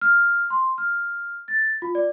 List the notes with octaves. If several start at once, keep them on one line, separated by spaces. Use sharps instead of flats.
F6
C6
F6
A6
F4
D5